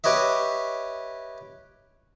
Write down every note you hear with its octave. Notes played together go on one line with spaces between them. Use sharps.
G4 B4 C#5 D#5 E5